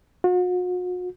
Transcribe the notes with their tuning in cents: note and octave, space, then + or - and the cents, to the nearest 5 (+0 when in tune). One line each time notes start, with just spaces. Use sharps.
F#4 -45